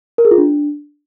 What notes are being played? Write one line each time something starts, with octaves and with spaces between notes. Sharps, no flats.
A#4
G#4
F4
D4